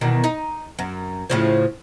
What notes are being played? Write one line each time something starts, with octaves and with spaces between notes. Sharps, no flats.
E2 B2 D#3
D#4
F#2
A2 C#3 F3